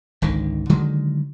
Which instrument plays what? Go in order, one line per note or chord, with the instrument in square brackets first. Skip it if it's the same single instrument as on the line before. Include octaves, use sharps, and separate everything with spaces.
[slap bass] G#1 C#2 D3 D#3
D3 D#3 F#3 G#3